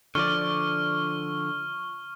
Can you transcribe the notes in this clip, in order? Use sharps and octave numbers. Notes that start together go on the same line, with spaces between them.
D3 F3 D5 C#6 F6 G7